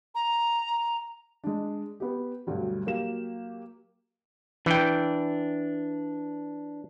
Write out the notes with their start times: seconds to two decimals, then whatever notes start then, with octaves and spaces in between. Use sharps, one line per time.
0.15 A#5
1.44 G#3 D4
2.00 B3 G4
2.47 D2 G2 B2 F#3 G3
2.86 F#3 A#3 G4 E7
4.66 E3 D4 G5